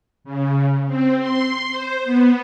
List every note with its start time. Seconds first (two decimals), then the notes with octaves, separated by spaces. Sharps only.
0.24 C#3
0.86 C4
1.20 C6
1.72 C5
2.04 B3